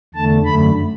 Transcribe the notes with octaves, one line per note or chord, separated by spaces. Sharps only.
E2 D3 A3 A5
F#2 D3 A3 B5